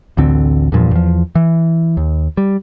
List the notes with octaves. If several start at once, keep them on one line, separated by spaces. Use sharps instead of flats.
A1 D2 D3 C4
E2 G2 A#2 F3
E2 F3
E3
D#2
G3